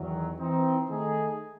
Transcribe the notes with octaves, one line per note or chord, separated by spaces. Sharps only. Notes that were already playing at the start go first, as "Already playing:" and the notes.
Already playing: E2 D#3 F#3
E3 C4 D#4
D#3 A3 D#4 G#4